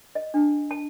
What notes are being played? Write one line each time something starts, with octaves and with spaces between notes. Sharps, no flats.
D#5
D4
A5